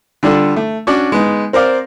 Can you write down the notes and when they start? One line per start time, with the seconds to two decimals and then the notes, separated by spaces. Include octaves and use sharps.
0.23 D3 G3 D4 F4 A4
0.56 A3
0.87 C#4 D4 F#4 D5
1.12 G#3 B3 D#4
1.53 C4 A#4 C5 D5 F5